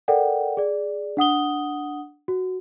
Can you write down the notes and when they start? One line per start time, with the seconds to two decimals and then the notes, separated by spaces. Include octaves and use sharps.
0.08 A4 A#4 D5 F#5 G5
0.57 G#4 D5
1.17 D4 F#5 D#6 G7
2.28 F#4